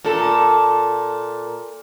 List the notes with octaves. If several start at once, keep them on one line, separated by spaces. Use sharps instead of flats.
A#2 A4